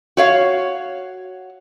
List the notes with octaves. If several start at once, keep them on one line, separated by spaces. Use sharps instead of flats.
F#4 C#5 F5